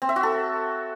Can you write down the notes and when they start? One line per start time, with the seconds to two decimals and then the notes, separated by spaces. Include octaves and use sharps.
0.02 C4
0.09 E5
0.16 F#4
0.23 A4